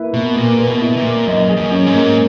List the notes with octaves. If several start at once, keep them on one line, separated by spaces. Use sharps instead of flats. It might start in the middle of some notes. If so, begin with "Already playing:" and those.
Already playing: A#3 E4 B4
B2 A#3
A#2 A#3
B4
B2
E4
A#2
A#3
F#2 D#5
G#4
F#2
C#4
G#2
A#3